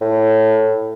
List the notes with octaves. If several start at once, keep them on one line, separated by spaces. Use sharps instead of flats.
A2